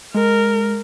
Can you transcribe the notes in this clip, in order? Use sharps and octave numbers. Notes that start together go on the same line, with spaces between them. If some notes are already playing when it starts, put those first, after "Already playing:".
G#3 A#4